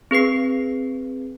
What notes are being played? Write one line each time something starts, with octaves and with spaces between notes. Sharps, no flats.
C4 G#4 B4 C7